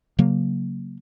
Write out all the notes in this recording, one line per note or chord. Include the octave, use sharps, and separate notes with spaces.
C#3 F#3 A#3